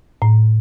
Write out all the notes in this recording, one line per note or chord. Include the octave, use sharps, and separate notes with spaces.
A2